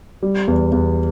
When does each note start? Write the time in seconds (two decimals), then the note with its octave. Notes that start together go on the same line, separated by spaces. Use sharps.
0.23 G3
0.48 E2
0.72 E2